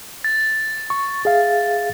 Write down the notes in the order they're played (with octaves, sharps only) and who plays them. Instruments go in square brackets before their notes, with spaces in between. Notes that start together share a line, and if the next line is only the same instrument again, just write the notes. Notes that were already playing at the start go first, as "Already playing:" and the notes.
[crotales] A6
[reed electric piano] C#6
G#4 E5 F5